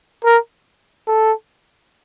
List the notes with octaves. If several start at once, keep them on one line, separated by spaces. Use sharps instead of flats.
A#4
A4